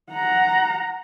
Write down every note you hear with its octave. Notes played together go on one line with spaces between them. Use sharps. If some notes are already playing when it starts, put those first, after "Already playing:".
F#5 A#5